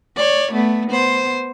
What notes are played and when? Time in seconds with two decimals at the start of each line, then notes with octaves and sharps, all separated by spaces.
0.16 C#5 D5
0.52 A3 B3
0.91 B3 C5